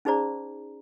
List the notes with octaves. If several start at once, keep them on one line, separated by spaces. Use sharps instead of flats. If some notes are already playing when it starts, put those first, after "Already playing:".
C#4 D#4 G#4 C5 D5 A#5